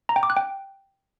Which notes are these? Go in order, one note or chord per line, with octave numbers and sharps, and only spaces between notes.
A#5
G5
D6
F#6
G5